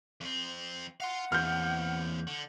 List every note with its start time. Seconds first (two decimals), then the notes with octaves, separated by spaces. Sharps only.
0.21 F2 C4
1.00 F5 F#5 C6
1.32 E2 A#3 C4 F6 G6
2.27 D3